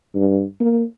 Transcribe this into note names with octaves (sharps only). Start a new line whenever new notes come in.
G2
A#3